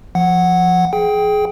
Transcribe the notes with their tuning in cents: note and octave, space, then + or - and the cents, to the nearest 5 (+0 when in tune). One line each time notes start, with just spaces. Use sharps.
F3 +0 F#5 +0
G#4 +20 G5 +0